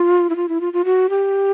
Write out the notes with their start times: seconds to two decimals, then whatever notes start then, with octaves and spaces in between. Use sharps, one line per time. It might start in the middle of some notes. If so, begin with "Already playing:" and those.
Already playing: F4
0.30 E4
0.36 F4
0.49 E4
0.61 F4
0.73 F4
0.85 F#4
1.10 G4